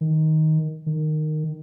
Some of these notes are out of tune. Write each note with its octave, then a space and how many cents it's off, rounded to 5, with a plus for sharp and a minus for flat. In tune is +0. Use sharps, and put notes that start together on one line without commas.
D#3 +10
D#3 -15